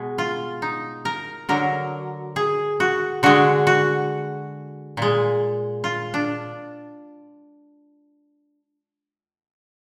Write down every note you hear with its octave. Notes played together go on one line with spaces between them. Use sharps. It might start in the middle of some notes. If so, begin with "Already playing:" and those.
Already playing: B2 G#3
F4
D#4
A#4
D3 F#3 A#4
G#4
F#4
D3 G#3 F#4
F#4
A#2 G#3
F4
D4